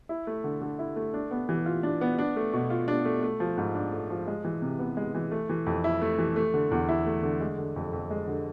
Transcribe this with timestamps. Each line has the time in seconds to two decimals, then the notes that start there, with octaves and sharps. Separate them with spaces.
0.09 E4
0.27 A3
0.44 D3
0.61 D3
0.79 E4
0.96 A3
1.14 D4
1.31 B3
1.49 E3
1.66 F4
1.83 D4
2.01 B3
2.19 D4
2.36 A3
2.53 B2
2.70 F4
2.88 D4
3.05 A3
3.23 A3
3.40 F3
3.57 G#2
3.75 D4
3.93 A3
4.10 F3
4.27 G#3
4.44 E3
4.62 C3
4.79 B3
4.97 G#3
5.15 E3
5.31 A3
5.49 E3
5.66 F2
5.84 E4
6.02 A3
6.19 E3
6.36 A3
6.54 D3
6.71 E2
6.89 E4
7.06 A3
7.23 D3
7.41 G#3
7.58 D3
7.76 F2
7.93 F2
8.10 G#3
8.27 D3